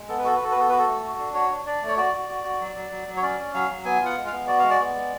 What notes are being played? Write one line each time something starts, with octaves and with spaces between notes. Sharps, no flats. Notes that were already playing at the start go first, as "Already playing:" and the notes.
Already playing: G#3
B3 A4
B4
F#4 A4
B4
F#4 A4
B4
B3 A4
F#4 B4
A4
A3
F#4
D4
F#4 C#5
D4
D4 D5
A3
C#5
F#4 D5
F#4
F#4
F#4
F#3
F#3
F#3
F#3
C#5
C#4 D5
C#4
F#3 F5
F#3
B3 G#5
F4
F#5
G#3
F5
B3
F#4 D5
G#3 F5
D5
B3
G#3